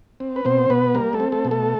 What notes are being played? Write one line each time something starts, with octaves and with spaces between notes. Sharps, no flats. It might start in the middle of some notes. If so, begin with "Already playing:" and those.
C4
B4
B2 C4 C5
B2 B3 B4
G3 A#3 A#4
A3 A4
C4
A3 A4
B2
A3 A4